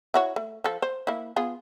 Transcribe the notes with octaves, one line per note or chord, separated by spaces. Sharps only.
E4 F#4 C#5
A3
F3 A4
C5
A#3 E4
B3 F4 G#4